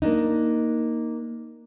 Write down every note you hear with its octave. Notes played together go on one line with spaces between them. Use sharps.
A#3 D4 D#4